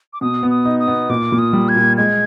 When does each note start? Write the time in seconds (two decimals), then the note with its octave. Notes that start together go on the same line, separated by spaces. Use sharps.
0.13 D6
0.21 B2 D#6
0.43 B3
0.50 D#6
0.65 D#4
0.80 D#6
0.88 B3
1.09 A#2 D6
1.32 A#2
1.38 D#6
1.53 G3
1.69 G#6
1.76 A#2
1.97 G#3 G#6